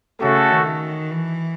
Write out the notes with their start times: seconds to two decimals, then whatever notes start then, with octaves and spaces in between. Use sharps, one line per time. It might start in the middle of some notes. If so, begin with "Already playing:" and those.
0.20 C#3 A3 C#4 F#4 A4
0.52 D#3
1.12 E3